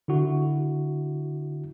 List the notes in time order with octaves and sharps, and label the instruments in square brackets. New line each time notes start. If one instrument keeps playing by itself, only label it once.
[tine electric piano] D3 E4 F#4